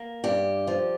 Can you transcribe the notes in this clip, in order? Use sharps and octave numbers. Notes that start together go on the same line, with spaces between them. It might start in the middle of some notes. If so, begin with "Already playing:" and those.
Already playing: A#3
G2 G4
F3